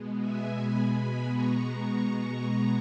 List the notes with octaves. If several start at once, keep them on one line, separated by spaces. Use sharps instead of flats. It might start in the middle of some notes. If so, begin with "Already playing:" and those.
Already playing: B2 G#3 B3
E5 G#5
G#5 B5
G#5 B5
A#5 C#6